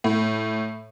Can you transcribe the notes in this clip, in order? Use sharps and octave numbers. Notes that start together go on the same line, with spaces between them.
A2